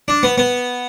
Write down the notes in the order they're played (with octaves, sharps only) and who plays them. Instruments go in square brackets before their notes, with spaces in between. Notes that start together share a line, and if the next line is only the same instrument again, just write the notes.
[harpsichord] D4
B3
B3